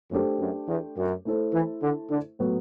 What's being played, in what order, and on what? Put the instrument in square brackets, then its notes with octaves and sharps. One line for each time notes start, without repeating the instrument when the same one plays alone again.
[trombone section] F#2 [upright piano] A3 D4 G4 C5
[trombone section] F#2
E2
F#2
[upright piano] A3 E4 A4 C5
[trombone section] E3
D3
D3
[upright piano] A2 F#3 B3 F#4